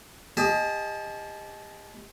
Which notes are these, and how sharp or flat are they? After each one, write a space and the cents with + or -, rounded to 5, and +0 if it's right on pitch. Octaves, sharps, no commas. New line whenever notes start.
G4 +40 D#5 +0 A5 -30